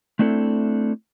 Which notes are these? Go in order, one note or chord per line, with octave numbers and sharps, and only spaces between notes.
A3 C4 D4 E4 A4